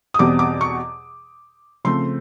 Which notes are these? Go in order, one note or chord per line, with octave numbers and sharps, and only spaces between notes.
D#6
E2 B2 G3 C4 D6
D6
C#6
C#3 F3 A3 C4 C6